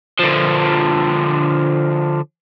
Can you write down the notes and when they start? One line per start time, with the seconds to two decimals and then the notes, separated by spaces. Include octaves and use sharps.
0.19 D3 F3